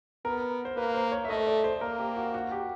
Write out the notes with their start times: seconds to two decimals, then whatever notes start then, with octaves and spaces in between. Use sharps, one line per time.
0.25 B3 A#4
0.65 C5
0.76 A#3 B4
0.95 C5
1.12 C#5
1.25 E5
1.29 A3 D#5
1.47 D5
1.64 C5
1.81 A#3 A#4
1.99 G4
2.16 F#4
2.34 F#4
2.51 G4